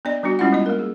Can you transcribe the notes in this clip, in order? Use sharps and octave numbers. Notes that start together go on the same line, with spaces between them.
B3 D4 D5 D#5
G3 B3 D4 F#4
G3 G#3 C#4 E4 F4 F#5
G3 B3 E4 D#5
A#3 A#4
G#4